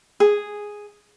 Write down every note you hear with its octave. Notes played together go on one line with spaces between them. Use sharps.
G#4